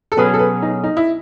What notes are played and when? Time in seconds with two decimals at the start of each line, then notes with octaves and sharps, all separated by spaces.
0.12 A4
0.17 B2 F#3 C#4 G#4 B4
0.34 A4
0.39 B4
0.62 D#4
0.84 D#4
0.97 E4